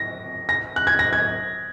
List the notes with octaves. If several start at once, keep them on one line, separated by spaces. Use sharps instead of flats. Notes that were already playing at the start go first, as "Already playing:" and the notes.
Already playing: A#6
A#6
F#6
G#6
A#6
G#6